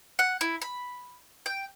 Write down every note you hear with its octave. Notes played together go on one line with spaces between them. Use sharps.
F#5
E4
B5
G5